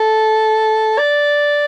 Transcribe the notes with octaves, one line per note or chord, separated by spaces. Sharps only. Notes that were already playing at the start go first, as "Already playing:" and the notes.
Already playing: A4
D5